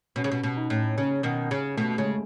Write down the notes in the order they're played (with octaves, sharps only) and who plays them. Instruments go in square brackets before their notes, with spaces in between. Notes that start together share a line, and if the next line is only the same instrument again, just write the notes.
[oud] B2 [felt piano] C#4
[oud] C#3
B2
B2
[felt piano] D#4
[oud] A2
[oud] C#3 [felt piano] C#4
[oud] B2 D#3
C#3
[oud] B2 [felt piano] A3
[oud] C#3 [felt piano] G#3